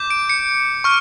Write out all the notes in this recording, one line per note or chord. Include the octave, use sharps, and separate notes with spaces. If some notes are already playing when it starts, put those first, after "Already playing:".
Already playing: D6 G6
D7
C#7
C#6 F6